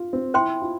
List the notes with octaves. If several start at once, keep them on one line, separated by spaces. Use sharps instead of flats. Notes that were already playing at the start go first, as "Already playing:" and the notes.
Already playing: F4
C4
E4 C5 G5 C6
F4